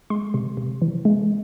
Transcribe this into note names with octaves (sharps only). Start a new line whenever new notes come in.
G#3 C6
C3
C3
E3
G#3